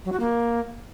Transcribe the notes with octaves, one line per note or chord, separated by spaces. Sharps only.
F#3
F#4
A#3